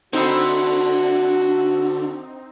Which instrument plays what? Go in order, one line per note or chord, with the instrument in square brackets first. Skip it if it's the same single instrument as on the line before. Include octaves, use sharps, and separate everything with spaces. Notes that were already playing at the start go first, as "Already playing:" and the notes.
[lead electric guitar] D3 [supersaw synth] C4 D#4 [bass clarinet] F#4 [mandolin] C5 E5 B5